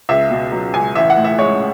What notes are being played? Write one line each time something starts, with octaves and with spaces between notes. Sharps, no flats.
C#2 E5
B2
F#3
C#2 G#5
A1 E5
F#5
A2
E5
G#3 C#5